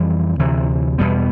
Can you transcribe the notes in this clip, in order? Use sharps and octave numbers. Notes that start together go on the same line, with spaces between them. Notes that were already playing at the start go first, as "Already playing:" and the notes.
Already playing: F2 E3 G3 C4
D2 C3 E3
E2 B2 G3 B3